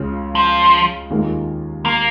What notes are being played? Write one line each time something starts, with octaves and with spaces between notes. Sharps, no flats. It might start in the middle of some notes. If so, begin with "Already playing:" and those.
Already playing: C#2 C#3 G#3 F4
F3
D#2 D#3 G#3 F4 A#4
A#3